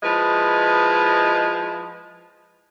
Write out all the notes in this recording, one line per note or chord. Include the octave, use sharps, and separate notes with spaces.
F3 G#3 E4 B4 D#5